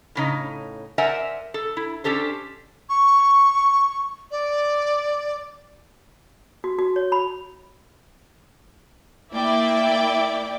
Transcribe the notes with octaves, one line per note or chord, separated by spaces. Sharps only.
A2 C#3 D#4
A#4 C5 D5 E5 F#5 G#5
A4
E4
C#4 D4 G4 A4 C5
C#6
D5
F#4
F#4
C#5
B5
A#3 E4 D5 E5 G5